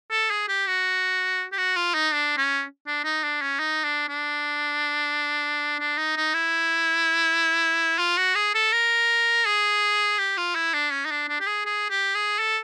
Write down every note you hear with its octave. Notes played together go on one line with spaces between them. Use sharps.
A4
G#4
G4
F#4
G4
F#4
F4
D#4
D4
C#4
D4
D#4
D4
C#4
D#4
D4
D4
D4
D#4
D#4
E4
F4
F#4
G#4
A4
A#4
G#4
G4
F4
E4
D4
C#4
D#4
D4
D4
G4
G#4
G#4
G4
G#4
A4